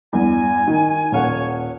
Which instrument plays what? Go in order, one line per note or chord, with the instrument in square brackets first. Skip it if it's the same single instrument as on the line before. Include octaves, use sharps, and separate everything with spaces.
[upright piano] E2 G2 [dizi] G#5
[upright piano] D#3
[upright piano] D#1 F5 F#5 [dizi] C#5